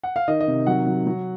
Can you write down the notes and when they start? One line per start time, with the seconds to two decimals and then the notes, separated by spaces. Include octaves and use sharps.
0.03 F#5
0.16 F5
0.28 D#3 D#5
0.41 D#5
0.48 C3
0.67 F#3 F#5
0.87 F#3
1.07 F#3